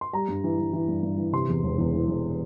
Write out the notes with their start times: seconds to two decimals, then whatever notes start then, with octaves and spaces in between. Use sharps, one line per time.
0.01 C6
0.13 G3 A#5
0.28 G2
0.44 E3
0.59 E3
0.73 E3
0.88 G2
1.03 G2
1.18 E3
1.33 C3 C6
1.48 E2
1.64 E1
1.78 E2
1.94 E3
2.08 E1